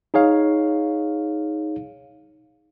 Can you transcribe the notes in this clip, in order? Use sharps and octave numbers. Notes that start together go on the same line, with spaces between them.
D#4 G#4 C#5 F5